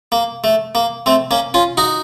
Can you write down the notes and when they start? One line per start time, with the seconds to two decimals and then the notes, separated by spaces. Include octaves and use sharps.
0.12 A#3
0.44 A3
0.75 A#3
1.06 A3 C4
1.31 A#3 C#4
1.54 C#4 F4
1.77 D#4 F#4